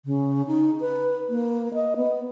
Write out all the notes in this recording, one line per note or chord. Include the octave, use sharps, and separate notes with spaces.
C#3
D#4
B4
A#3
D#5
B3